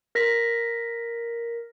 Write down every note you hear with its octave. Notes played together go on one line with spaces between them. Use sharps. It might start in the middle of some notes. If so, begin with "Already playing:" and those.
A#4 A#6 B6